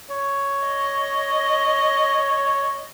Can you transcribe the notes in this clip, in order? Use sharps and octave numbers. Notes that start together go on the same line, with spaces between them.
C#5
D#5